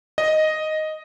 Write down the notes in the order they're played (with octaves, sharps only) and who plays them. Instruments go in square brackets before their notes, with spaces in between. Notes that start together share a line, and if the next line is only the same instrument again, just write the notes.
[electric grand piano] D#5